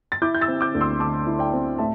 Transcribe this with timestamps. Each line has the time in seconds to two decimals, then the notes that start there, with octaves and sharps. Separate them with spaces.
0.12 A6
0.22 E4 D6 G6
0.34 G6
0.41 E6 A6
0.48 C4
0.61 D6 G6
0.75 D2
0.81 C6 E6
1.00 D3 A5 D6
1.27 E4
1.39 D5 G5
1.53 C4
1.78 A2 E5 A5